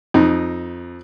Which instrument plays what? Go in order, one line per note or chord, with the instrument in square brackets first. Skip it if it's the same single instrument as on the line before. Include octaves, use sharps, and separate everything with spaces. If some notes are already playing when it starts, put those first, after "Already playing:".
[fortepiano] F2 D#4